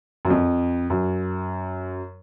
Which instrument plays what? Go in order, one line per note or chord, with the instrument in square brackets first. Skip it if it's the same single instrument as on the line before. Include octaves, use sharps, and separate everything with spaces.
[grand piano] F#2
F2
F#2